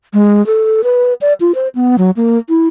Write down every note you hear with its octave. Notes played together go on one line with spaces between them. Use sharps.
G#3
A4
B4
D5
F4
C5
B3
F#3
A#3
E4